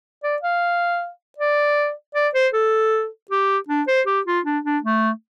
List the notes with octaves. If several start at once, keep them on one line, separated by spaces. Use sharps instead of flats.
D5
F5
D5
D5
C5
A4
G4
D4
C5
G4
F4
D4
D4
A3